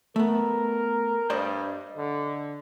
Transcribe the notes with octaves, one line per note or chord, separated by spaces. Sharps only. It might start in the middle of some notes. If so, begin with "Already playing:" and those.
A3 B3 A#4
G2 C5 D5 D#5
D3